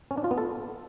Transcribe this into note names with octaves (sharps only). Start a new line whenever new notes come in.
C#4
D4
F4
B3
A4